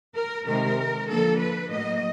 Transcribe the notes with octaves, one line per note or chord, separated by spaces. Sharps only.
A#4
C3 D#3 G#3 A#4
D3 F3 A#3 A4
B4
A2 F#3 A#3 D#5